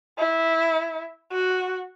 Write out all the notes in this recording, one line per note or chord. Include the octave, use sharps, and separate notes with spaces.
E4
F#4